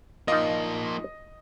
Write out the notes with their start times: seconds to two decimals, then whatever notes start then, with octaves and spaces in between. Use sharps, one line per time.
0.28 F3 A#3 D#4 F4 D#5